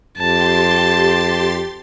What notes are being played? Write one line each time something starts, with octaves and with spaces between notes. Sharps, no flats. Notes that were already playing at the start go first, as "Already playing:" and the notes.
F2 G4 A5 C6 A6